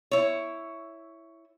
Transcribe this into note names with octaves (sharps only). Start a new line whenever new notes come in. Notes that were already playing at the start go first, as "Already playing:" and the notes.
E4 C#5